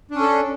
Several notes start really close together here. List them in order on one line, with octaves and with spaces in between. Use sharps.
D4 C#4 A4